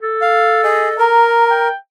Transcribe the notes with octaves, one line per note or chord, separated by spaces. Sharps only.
A4
F5
G#4 D#5
A#4 A#5
G5